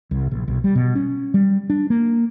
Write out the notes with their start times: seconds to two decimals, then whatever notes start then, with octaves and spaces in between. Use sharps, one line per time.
0.11 C2
0.31 A#1
0.48 B1
0.64 G3
0.75 B2
0.95 C#4
1.34 G3
1.70 D4
1.90 A#3